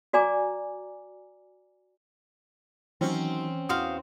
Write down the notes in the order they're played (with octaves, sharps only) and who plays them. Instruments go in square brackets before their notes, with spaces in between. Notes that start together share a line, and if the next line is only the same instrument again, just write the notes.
[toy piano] F#4 D5 G#5 A#5 D6
[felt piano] D#3 F#3 [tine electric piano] E3 [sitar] C4 C#4
[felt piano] E2 [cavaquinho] F#4 C5 F5 [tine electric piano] D#6